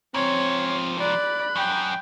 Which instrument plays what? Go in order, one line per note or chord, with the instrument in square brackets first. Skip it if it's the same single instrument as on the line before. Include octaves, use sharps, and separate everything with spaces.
[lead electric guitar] G#2 F3 [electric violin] C4 [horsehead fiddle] C#5
[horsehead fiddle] D5 [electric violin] B5 F#6
[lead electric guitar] F#2 [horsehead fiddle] G5